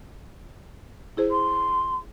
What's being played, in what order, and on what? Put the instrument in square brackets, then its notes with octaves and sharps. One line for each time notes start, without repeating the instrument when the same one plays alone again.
[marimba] E4 G#4 C5
[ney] C6